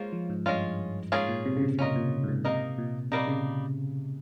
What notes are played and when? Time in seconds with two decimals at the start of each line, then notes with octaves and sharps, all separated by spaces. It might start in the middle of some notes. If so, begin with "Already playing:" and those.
Already playing: G#3 A#3 C#4 F4 C5
0.12 F3
0.30 G#2
0.46 G2 G#3 C#4 F4
1.12 G#2 A#3 C#4 F4 G#4
1.29 A#2
1.45 C3
1.57 C#3
1.62 C3
1.78 A#2 C#4 F4 A#4 D#5
1.96 A#2
2.23 G#2
2.28 A#2
2.45 C3 A#3 D#4 A#4 D#5
2.78 A#2
3.12 C3 G3 A#3 D#4
3.28 C#3